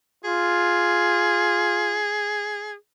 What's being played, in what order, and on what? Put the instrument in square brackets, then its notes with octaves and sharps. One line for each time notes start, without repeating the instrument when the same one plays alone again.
[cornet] F4 [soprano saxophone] G#4